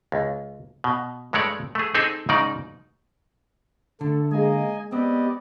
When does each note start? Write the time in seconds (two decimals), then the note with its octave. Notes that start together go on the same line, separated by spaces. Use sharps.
0.12 C#2
0.84 B2
1.33 G2 G#3 A3 C#5 D5
1.75 A3 G#4
1.94 C4 D#4 G#4 A4 G#5
2.29 G#2 C#3 D#4 D5
4.01 D3 A3 A4
4.32 G#3 A#3 G#4 D#5 G#5
4.92 B3 C4 G4 D5 D#5